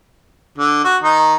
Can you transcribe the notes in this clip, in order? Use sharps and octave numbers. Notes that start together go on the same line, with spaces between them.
D3
F#4
D#3 D#4